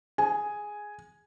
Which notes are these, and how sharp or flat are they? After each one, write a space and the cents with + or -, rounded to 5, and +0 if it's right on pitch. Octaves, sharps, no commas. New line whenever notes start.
G#4 +0 G#5 +0